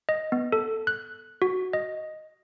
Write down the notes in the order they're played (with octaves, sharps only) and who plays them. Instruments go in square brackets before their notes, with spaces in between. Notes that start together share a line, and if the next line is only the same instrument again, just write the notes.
[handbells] D#5
B3
A4
F#6
F#4
D#5